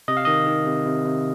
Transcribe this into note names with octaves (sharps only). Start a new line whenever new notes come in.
C3 D#5
F5
D#3 D#5
D#3
C3
C3
C3